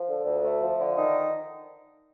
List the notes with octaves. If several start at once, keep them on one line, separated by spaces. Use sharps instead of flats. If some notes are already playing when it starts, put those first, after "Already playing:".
Already playing: F3
D3
D2
A3
F3
D3
D#3 D#4